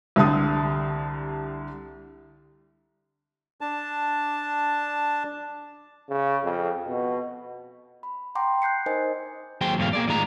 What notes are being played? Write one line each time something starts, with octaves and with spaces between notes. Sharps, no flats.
C2 D3 G3 A5 D#6
D4 A5
C#3
F2
B2
B5
F#5 G5 A#5 C6 D6
F#6 G6 C7 C#7
D#4 A#4 C5 D#5 G#5
D#2 F#3 G#4 C5 G5
E2 G#2 B2 A3 F5
A#3 G#4 D5
A2 D#3 G#3 F4 A#5